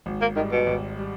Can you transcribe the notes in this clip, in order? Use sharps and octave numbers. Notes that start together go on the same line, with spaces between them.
G#1
A#3
G#2 D#3 G3
B2
G#1
G3